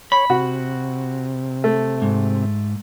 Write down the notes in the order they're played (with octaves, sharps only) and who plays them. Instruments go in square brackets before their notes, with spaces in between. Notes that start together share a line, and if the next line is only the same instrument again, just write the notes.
[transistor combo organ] C#5 [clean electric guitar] B5
[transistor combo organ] C3 [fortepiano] F#4
[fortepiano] A3
[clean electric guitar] G#2